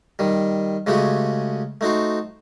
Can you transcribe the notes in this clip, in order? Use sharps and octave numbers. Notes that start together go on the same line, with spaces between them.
D#3 G3
C#3 G#3 A3 F#4 G4
A3 D#4 F#4 C5